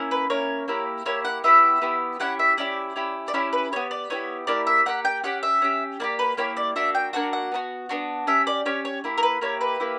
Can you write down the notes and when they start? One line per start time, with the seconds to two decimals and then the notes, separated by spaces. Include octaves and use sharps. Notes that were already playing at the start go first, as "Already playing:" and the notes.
Already playing: A#3 C#4 E4
0.11 B4
0.30 A#3 C#4 E4 C#5
0.68 A#3 E4 G4
1.06 A#3 E4 G4 C#5
1.25 F#5
1.44 B3 E4 G4 E5
1.82 B3 E4 G4
2.20 C#4 E4 G4 F#5
2.39 E5
2.57 C#4 E4 G4 D5
2.96 C#4 E4 G4
3.28 D5
3.34 C#4 E4 G4 C#5
3.53 B4
3.72 E4 G4 C#5
3.76 B3
3.91 D5
4.10 B3 E4 G4 C#5
4.47 A#3 E4 G4 D5
4.67 E5
4.86 A#3 E4 G4 F#5
5.05 G5
5.23 C#4 G4 F#5
5.43 E5
5.62 C#4 G4
6.00 A#3 E4 G4 D5
6.19 B4
6.37 A#3 E4 G4 C#5
6.57 D5
6.76 A#3 D4 F#4 E5
6.95 G5
7.13 A#3 D4 F#4 F#5
7.33 F#5
7.52 B3 D4 F#4
7.89 B3 D4 F#4
8.27 C#4 G4 E5
8.47 D5
8.65 C#4 G4 C#5
8.85 C#5
9.04 A#3 E4 G4
9.18 A#4
9.23 B4
9.41 A#3 E4 G4 C#5
9.61 B4
9.80 A#3 E4 G4